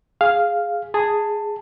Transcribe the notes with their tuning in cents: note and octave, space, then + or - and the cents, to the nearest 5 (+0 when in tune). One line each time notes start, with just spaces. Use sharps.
G#4 +0 F5 +0
G#4 +0 A5 +15